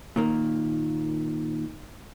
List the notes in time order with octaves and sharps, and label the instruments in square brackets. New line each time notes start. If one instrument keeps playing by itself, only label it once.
[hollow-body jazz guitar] A#2 D#3 A#3